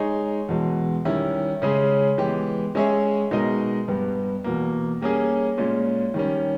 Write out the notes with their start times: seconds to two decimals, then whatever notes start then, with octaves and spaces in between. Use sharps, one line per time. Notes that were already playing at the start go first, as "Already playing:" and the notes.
Already playing: G#3 D#4 G#4 C#5
0.49 E2 B2 G#3
1.05 D#3 G3 C#4 E4
1.62 C#3 G#3 C#4 G#4
2.18 E3 G#3 B3 G4
2.75 G#3 C#4 G#4 C#5 E5
3.31 B2 G#3 D#4 A#4 D#5
3.88 G2 G3 B3
4.44 E2 B2 A#3
5.01 G3 A#3 C#4 G#4
5.58 A#2 G#3 C#4
6.14 D#3 G3 C#4